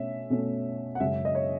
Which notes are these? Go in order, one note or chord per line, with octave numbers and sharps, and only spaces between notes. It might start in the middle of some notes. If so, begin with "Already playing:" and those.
Already playing: B2 A3 C#4 E5
B2 A3 C#4
F#5
F#2 C#3 G#3 C#4 E5
D#5
C#5